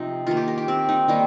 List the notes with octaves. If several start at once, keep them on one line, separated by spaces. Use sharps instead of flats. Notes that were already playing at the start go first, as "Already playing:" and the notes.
Already playing: C3 F3 D#4
D#3 A#3 F4
G4
A#4
G4
C4
D#4
D#3 G3 A#3 D#4